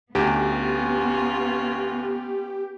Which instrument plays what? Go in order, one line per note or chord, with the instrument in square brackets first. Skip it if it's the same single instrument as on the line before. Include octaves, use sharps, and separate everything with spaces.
[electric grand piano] D2 [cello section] B3 [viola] C#4 F4 [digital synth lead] G4